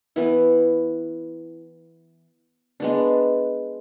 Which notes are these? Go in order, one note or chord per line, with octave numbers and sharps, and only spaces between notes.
E3 B3 E4 B4
G#3 B3 D4